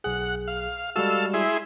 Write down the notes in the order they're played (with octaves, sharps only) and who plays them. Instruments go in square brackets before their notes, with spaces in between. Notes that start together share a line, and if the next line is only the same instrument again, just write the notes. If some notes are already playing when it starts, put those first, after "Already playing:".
[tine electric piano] B1 G#4 [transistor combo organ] F#5
[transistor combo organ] F5
[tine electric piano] G3 G#3 F#4 [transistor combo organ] A4 F5 E6
[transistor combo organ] E4 G#4 C6